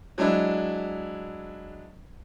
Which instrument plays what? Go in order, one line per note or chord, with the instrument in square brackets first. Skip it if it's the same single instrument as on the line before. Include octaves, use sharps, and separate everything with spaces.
[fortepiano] F#3 G#3 D4 E4